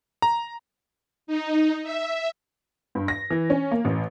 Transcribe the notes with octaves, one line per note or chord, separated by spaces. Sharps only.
A#5
D#4
E5
G2
A#6
E3
C#4
A#3
A1